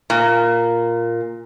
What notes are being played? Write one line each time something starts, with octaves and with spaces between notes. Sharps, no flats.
A#2